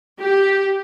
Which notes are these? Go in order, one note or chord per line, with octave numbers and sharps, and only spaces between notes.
G4